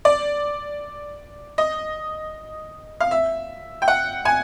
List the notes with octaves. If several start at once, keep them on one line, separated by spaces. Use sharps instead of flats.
D5
D#5
F5
E5
G5
F#5
G#5